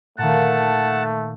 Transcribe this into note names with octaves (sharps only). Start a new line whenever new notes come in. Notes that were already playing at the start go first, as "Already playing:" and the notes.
A#2 D#3 A3 F#5 A5